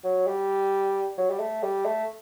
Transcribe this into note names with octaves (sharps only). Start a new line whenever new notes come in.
F#3
G3
F#3
G3
A3
G3
A3